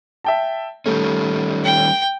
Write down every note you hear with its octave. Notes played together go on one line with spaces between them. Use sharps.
E5 G5 A5
D#3 G3 A3 C#4
G5